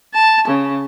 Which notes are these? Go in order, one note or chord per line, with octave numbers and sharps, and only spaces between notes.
A5
C#3